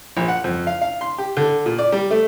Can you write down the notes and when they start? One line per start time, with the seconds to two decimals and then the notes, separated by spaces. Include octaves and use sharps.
0.17 A#1
0.28 F#5
0.44 F2
0.67 F5
0.82 F5
1.01 C6
1.18 G4
1.37 D3
1.66 A#2
1.79 D5
1.92 G3
2.10 A3